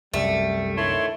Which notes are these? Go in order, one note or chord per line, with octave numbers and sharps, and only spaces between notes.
C2 F#2 G3 A3
D3 D#3 E4 C#5 A5 C6